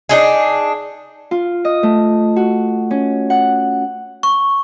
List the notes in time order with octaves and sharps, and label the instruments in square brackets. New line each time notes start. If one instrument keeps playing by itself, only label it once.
[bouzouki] D4 D#4 G#4
[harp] F4
D#5
A3
F#4
C#4
F#5
[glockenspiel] C#6